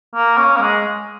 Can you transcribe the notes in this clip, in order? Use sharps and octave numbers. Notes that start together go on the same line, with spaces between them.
A#3
C#4
A#3
G#3